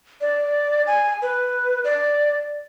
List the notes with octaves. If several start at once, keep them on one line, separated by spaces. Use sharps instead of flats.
D5
G#5
B4
D5